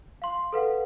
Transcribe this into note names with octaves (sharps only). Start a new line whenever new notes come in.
F5 C6
A4 B4 F5 F#5